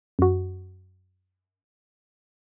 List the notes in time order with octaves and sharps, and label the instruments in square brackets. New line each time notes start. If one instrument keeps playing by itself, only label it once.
[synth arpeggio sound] F#2 F#4